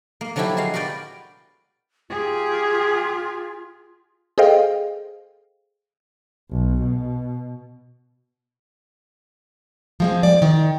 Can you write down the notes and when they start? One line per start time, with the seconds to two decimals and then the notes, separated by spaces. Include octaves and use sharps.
0.21 A#3
0.36 D3 F3 F#3 D4 E4 G4
0.57 G#3 F#4 F5
0.74 F#4 A#4 B4 D5 G5
2.10 F4 G4 G#4
4.38 G#4 A4 C5 D#5 F5 G5
6.51 B1
6.82 B2
10.00 F3 G#3 C4
10.23 D5
10.42 D#3